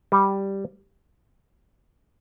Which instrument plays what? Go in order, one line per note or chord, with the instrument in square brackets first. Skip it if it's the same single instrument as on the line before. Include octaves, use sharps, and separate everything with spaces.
[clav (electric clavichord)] G3